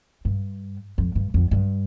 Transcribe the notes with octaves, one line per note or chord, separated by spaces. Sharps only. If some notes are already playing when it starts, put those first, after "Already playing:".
G2
F2
G2
F2
G2